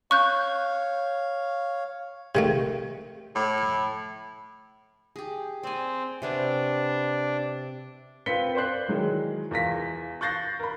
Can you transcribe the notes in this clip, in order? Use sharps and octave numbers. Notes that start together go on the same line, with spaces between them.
C#5 F5 C#6 F#6 G6
C3 D#3 A3
A2
G4 G#4
C4 D5 G#5
C3 B3 D4 C#5
C4 F4 B4 B6 C#7 G7
C5 D5 C6 F#6 C7
D#3 E3 F#3 G#3
E2 F4 A#6 B6
C#6 F#6 G6 A6 A#6 C7
A#4 B5